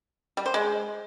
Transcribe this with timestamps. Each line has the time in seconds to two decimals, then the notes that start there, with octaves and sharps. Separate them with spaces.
0.37 G3
0.46 C5
0.54 G#3